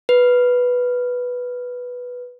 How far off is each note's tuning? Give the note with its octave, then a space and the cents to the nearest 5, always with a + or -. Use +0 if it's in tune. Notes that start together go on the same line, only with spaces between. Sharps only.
B4 -5